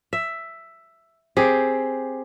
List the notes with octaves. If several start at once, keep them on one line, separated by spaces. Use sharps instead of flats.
E5
C4 G4 G#4